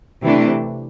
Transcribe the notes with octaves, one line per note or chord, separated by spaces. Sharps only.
C3 E3 A3 D4